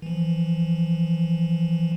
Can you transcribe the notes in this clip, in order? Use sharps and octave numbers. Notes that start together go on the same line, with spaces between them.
E3 F3